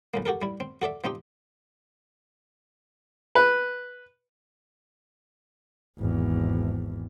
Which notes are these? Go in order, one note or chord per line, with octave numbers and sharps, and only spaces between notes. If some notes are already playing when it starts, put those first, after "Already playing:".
B1 F2 A#3
F#4 G4 A4 A#4
G3 E4
C4
F#4 A4 D5 E5
F3 C4 D#4 G4
B4
G#1 E2